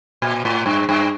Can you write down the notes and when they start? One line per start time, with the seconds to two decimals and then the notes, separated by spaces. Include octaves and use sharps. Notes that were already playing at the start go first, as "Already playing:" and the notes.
0.22 A#2
0.45 A2
0.66 G2
0.89 G2